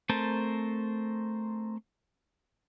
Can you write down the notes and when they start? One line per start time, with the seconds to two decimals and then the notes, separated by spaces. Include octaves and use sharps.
0.09 A3 C4 A#4 C5 A5